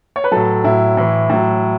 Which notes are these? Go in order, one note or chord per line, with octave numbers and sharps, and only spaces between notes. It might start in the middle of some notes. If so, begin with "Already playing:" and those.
C#5
B4
A2 F#3 A4
A2 F#3 E4
A2 E3
A2 F#3